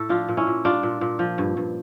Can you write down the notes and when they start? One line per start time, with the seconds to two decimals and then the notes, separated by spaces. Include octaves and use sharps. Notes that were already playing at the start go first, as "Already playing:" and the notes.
Already playing: A2 A4
0.09 F3 D4 F4
0.28 A#2
0.37 C#4 E4
0.47 A#2
0.64 G3 D4 F4
0.83 A#2
1.01 A#2
1.19 F3
1.38 G2
1.57 G2